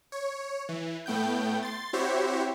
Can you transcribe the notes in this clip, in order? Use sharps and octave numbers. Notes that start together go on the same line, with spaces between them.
C#5
E3
A2 A3 B3 G5 G6
C6 A6
C4 E4 F#4 G4 C5 C#5